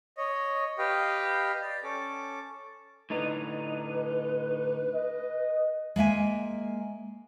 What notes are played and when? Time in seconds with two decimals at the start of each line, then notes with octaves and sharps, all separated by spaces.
0.17 C#5 D#5
0.78 G4 B4 D#5 F5 G5
1.62 D5
1.83 C#4 A4 D6
3.10 A2 D3 D#4 B4
4.94 D#5
5.96 G#3 A#3 E5 G#5